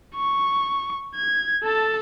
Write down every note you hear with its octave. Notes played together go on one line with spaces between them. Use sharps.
C#6
G#6
A4 A5